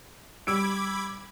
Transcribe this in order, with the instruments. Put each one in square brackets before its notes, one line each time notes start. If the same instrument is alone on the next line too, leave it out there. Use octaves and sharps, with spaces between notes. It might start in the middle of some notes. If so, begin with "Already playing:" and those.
[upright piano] G3 E6 D7 [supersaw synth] B5 D6 G#6